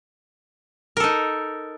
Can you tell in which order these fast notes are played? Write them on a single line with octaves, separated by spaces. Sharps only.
A#4 A4 D#4